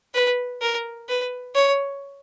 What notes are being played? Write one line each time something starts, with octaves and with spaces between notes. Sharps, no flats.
B4
A#4
B4
C#5